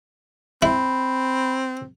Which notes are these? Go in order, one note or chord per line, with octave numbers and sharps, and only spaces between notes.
C4 E4 B5